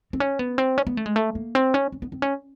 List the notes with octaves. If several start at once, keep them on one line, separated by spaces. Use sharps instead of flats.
C4
C#4
B3
C4
C#4
B3
A3
G#3
A3
A#3
C4
C#4
C4
B3
C4
C#4